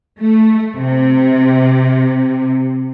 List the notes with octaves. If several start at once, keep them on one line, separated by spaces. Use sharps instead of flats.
A3
C3